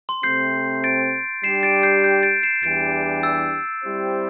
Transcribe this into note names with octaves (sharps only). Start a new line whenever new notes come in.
C6
C3 A3 C4 G6 C7
A6 D7
G3 D4 G4 C7 E7
A6 D7
G6 C7
G6
A6 D7
C7 E7
E2 E3 G3 D4 G4 A6 D7
E6 A6
G3 C4 E4 G4 C5